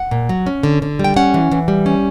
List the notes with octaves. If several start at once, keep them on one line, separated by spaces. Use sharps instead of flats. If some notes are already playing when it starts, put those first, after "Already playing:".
Already playing: F#5
A#2
F#3
C#4
D3
D3
G3 G5
C#4 F#5
E3
E3
G3
C#4